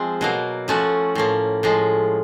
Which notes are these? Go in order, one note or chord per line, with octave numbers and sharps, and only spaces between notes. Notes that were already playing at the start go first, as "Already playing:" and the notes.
Already playing: F3 G#3 C4
B2 F#3 A#3
F3 A3 C#4 F#4
A2 F3 A#3
A2 F3 G#3